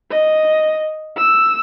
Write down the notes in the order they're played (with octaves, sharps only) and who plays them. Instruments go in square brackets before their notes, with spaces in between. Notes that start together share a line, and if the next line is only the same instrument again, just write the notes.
[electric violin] D#5
E6